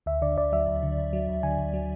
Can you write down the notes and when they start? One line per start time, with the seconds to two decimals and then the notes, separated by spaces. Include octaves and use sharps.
0.06 D2 E5
0.22 D3 D5
0.37 D2 D5
0.52 F#3 E5
0.68 D2
0.83 D3
0.98 D2
1.13 F#3
1.29 D2
1.43 D3 G#5
1.58 D2
1.73 F#3